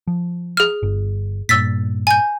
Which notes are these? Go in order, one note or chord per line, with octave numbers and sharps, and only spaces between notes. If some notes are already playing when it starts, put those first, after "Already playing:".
F3
G#4 F6
G1
G2 A#2 E6 A6 B6
G#5 G6